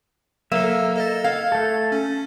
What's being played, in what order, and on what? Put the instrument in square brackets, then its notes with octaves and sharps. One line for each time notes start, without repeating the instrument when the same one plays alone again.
[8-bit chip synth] F#3 A4 [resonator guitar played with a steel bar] A#3 [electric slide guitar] E5
[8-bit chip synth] A4 D#5 A6
[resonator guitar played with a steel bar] F5 [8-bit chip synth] G#6
[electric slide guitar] A3 A4
[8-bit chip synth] C#4